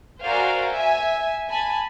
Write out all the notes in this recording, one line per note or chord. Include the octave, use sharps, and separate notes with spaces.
F#4 A#4 C5 D5 F5 G#5
E5 G#5
G#5 A5 B5